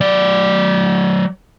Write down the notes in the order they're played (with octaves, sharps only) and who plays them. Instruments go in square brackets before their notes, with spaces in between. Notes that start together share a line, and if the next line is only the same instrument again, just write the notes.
[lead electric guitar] F#3 D5